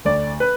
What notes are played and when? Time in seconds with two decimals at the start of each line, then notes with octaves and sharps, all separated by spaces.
0.05 D2 D5
0.40 B4